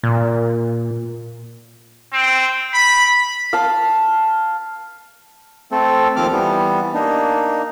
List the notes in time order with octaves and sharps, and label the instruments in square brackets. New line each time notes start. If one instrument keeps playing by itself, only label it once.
[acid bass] A#2
[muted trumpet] C4
B5
[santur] F5 A5
[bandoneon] A3 C4 A4
D#2 F3 C4 D6 F6
E3 G3 B3
A#3 D4 D#4